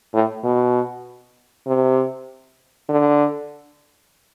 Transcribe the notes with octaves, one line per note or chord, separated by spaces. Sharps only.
A2
B2
C3
D3